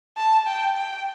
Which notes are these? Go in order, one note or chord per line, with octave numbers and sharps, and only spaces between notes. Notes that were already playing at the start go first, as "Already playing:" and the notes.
A5
G5
G5